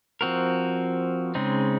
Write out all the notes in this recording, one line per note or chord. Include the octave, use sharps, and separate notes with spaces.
F3 C4 F#4 A#4
C#3 G#3 C4 D#4